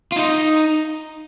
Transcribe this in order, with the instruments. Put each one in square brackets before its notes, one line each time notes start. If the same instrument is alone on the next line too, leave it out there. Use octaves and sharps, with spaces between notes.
[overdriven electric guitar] F4
D#4